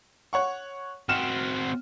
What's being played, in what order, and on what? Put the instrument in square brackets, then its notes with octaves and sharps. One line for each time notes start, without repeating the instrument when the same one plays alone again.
[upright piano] C#5 F#5 C#6
[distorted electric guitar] C4 F#4 [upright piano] F6 E7